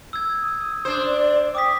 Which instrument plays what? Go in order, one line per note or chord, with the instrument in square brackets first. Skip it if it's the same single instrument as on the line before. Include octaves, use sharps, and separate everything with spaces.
[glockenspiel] E6 G#6
[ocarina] D#6
[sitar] D4 C5
[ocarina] D5
[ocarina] G5 [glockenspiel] D6 D#6 B6